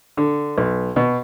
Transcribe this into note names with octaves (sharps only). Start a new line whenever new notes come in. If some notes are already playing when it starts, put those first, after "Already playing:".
D3
B1
B2